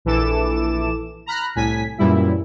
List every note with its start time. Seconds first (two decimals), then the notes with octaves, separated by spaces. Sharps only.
0.05 A#1 E3 A4 D6 E7
1.26 A#5 B5 F6 F#6
1.55 C2 A2 G#5 B6
1.98 F#2 A#2 E3 G3 E4